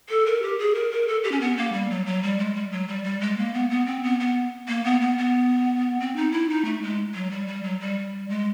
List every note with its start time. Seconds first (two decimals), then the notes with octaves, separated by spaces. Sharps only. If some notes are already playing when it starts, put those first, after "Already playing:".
0.09 A4
0.26 A#4
0.43 G4
0.59 G#4
0.75 A#4
0.92 A#4
1.08 A4
1.24 G4
1.32 C#4
1.41 B3
1.57 A#3
1.73 G3
1.90 F#3
2.06 F#3
2.22 G3
2.38 G#3
2.55 G3
2.72 F#3
2.88 G3
3.04 G3
3.21 G#3
3.38 A#3
3.54 B3
3.70 B3
3.86 C4
4.03 B3
4.20 B3
4.68 A#3
4.84 B3
5.01 B3
5.18 B3
6.00 C4
6.16 D#4
6.32 E4
6.49 D#4
6.65 A3
6.82 G#3
7.15 F#3
7.31 G3
7.47 G3
7.63 F#3
7.80 G3
8.29 G#3